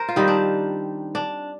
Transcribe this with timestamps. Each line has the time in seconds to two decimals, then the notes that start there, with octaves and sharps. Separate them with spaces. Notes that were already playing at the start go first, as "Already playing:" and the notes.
Already playing: A#4 C5
0.09 F4
0.16 D#3 G3 C4 D#4
0.28 D4
1.15 D4